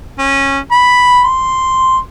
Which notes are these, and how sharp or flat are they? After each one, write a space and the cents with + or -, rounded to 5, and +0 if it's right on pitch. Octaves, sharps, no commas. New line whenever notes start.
C#4 -15
B5 +0
C6 -5